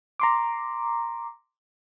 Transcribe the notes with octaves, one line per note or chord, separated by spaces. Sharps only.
A#5 C6 D6